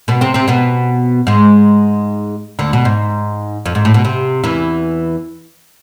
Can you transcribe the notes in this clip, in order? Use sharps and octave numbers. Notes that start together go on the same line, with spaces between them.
B2 B3
C3 C4
C3 C4
B2 B3
G#2 G#3
D2 D3
B2
G#2
F2
G#2
A2
B2
C3
E2 E3